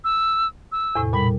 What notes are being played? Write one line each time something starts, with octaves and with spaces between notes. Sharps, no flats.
E6
E6
E2 A2 C3
A#2 G3 B5